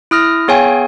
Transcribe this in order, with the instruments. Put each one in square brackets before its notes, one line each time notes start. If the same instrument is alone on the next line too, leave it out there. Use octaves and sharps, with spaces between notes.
[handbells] E4 D#6 F6 A#6
B3 G#4 C#5 F5 G5 G#5